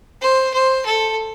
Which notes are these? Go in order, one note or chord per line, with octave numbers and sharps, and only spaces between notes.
C5
C5
A4